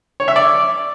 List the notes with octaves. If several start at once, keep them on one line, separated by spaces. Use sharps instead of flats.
C#5
E5
D5